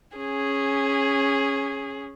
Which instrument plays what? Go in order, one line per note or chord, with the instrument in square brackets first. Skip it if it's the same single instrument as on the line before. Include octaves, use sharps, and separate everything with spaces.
[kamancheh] C#4 G#4